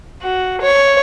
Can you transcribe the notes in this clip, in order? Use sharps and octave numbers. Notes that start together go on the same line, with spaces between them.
F#4
C#5